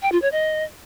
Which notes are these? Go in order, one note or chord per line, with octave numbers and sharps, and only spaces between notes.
G5
F4
C#5
D#5